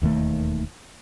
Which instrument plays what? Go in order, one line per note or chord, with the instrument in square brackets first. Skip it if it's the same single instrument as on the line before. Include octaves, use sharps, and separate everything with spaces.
[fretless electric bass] E1 D#2 D#3 A3